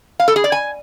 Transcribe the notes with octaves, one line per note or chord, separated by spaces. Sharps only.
F5
A4
G#4
D5
G#5